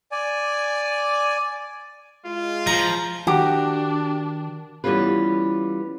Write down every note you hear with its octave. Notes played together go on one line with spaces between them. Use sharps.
D5 G#5
G#3 F4
F3 A#5
D#3 D4 F#4 G4
E3 G3 B3 C#4 F4 B4